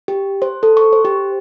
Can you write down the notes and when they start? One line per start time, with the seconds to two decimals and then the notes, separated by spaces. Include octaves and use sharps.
0.08 G4
0.42 C5
0.63 A4
0.77 C#6
0.93 C5
1.05 G4